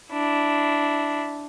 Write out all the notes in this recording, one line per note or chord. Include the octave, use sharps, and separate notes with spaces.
D4 E4